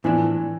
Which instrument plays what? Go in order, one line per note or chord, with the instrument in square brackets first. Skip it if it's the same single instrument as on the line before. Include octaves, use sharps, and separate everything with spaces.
[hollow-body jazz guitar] A2 F3 B3 D4 [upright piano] E3